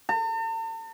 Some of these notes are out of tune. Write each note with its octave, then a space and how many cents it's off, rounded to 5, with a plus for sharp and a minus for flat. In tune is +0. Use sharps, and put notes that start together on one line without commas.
A5 +45